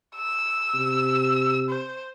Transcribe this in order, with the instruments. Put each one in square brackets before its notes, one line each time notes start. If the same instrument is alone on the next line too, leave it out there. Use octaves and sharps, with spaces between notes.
[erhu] E6
[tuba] C3
[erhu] C5